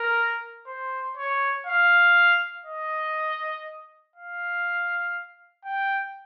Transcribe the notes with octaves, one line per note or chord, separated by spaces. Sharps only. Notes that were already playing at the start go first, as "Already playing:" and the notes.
Already playing: A#4
C5
C#5
F5
D#5
F5
G5